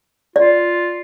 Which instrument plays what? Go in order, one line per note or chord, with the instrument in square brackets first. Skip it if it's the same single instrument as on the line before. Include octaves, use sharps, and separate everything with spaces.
[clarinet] F4 [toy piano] D5